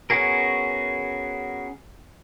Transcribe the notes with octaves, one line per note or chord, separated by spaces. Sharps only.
B3 C#4 F#4 G#4 A#4